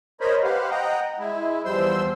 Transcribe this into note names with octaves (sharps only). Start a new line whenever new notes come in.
A#4 C5 C#5 D#5 B5
G4 B4 C5 F5 F#5
D#5 F#5 G5 A#5
G#3 E4
E2 F3 G3 C5 C6 E6